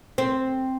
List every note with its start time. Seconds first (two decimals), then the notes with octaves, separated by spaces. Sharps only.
0.18 C4